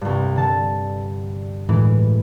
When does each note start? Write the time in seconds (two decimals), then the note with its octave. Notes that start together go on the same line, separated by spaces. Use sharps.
0.01 C2 G2
0.36 D3 A5
1.69 A2 D3 E3 G#3